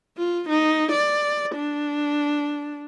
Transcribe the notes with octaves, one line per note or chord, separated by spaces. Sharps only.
F4
D#4
D5
D4